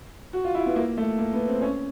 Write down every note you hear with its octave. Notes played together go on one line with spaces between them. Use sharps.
F#4
F4
E4
B3
A#3
A3
A#3
B3
C4
C#4